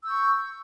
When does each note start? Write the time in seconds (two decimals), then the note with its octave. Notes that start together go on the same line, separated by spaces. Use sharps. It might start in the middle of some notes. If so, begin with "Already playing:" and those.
0.03 E6
0.06 G6
0.09 C#6